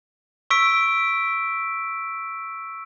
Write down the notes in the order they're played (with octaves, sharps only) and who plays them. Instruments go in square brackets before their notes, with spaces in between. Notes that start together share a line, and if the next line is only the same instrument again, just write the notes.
[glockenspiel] C#6 E6 B6 D7